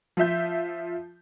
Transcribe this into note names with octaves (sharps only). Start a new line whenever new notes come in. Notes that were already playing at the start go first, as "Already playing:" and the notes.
F3 F4 E5 G6